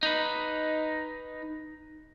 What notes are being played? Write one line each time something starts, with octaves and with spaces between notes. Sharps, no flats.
D#4 B4